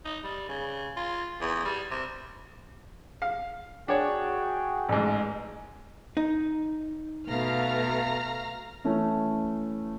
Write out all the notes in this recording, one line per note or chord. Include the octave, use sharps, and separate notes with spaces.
D#4
G3
C#3
F4
E2
G3
C3
F5
D4 F#4 G#4 C#5 G5
A1 G#2 E5 A#5
E2 D#5
D#4
B2 A3 F5 A#5 F6
E3 A3 C#4